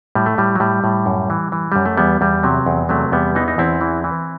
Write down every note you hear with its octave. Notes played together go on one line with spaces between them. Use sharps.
A2 G3
A3
A2 G3
F#3
A2 G3
A2
F#2
E3
E3
F#2 G3
A3
E2 G3 B3
E2 G3
C3 F#3
E2
C3 F#3 A3
E2 G3 B3
E3 B3 D#4
D#4
E2 C4 E4
E3
E3